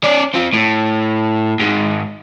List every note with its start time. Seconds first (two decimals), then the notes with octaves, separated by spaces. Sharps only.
0.04 C#4 D5
0.34 C4 F4
0.54 A2
1.60 G#2 D#3